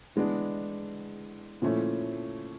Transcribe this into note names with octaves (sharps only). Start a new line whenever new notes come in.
E3 G#3 B3 D4
A#2 F3 A3 C#4 E4